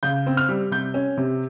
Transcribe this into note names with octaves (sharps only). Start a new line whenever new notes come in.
C#3 G6
C4
F6
G3
C3 G6
C#4
C3